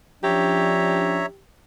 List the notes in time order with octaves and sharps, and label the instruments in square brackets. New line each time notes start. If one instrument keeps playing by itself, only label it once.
[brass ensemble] F3 C#4 D4 [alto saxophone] G4 [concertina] C#5 E5 A#5